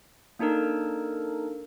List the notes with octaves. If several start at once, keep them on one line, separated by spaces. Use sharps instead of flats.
A#3 D4 D#4 A4 A#4